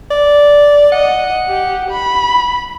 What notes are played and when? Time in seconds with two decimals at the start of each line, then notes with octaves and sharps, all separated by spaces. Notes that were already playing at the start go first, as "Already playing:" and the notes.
0.11 D5
0.92 D#5 F#5
1.49 G4
1.91 B5